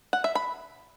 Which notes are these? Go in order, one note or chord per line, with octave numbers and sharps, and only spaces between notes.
F#5
E5
B5